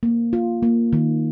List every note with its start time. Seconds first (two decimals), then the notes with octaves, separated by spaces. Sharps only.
0.03 A#3
0.33 F4
0.63 A#3
0.93 D#3